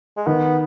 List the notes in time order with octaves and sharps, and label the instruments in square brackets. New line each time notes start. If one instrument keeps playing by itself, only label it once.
[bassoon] G#3
[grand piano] D#3 [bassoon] B3